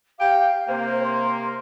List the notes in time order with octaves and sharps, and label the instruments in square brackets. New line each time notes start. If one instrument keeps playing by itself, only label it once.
[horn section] G4 G5 [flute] F5
[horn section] C3 A#3 [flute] C5
[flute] C6